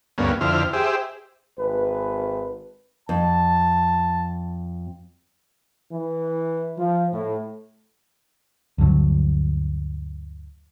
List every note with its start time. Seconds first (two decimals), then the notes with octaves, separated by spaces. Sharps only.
0.18 D2 G2 A#3 B3 C#4
0.41 F2 D3 E4 C5 F6
0.73 G4 G#4 C5 E5
1.57 G#1 B4
3.09 F2 A5
5.92 E3
6.77 F3
7.12 A2
8.78 D2 G2 D3 F#3